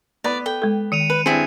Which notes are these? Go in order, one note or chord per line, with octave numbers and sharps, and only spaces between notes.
B3 B4 D5
A4 G5
G#3 A4
D#3 C#7 D#7 F7
B4
G2 C4 E4 G#4 C#7